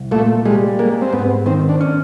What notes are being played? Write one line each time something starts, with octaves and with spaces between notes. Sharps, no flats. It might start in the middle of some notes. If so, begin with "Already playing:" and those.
Already playing: C2
A#2 A3
G3 G#3
G#3 A#3
C4
G#2 B3
D#3 C4
D4
C#4